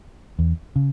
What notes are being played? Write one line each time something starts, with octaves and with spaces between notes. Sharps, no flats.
E2
C#3